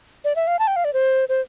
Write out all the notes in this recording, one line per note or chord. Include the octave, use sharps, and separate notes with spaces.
D5
E5
F5
A5
G5
F5
D5
C5
C5